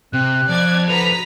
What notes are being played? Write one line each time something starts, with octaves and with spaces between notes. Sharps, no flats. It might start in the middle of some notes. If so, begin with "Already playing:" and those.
C3 C4 F#6
F2 F3 D5 G#6
F#4 A4 B4 A#5 B6 F7